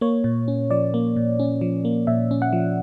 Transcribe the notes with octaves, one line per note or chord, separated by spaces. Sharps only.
A#3 C#5
A#2
C#4
F3 D5
A#3
A#2
C#4
F3
A#3
A#2 E5
C#4
F#5
F3